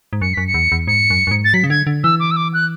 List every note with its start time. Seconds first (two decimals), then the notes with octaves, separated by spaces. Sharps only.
0.13 G#2
0.21 F#2 C#7
0.34 F#2 B6
0.47 C#7
0.54 E2
0.72 E2
0.87 G#2 C#7
1.10 F#2
1.27 F#2
1.31 G#2
1.44 A6
1.54 F#3 B6
1.64 C#3
1.70 D3 G#6
1.87 D3
2.04 E3 E6
2.20 D6
2.31 E6
2.36 D6
2.53 F#6